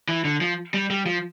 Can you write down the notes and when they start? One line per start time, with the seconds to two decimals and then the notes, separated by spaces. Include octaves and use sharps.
0.09 E3
0.25 D3
0.41 F3
0.74 G3
0.90 G3
1.06 F3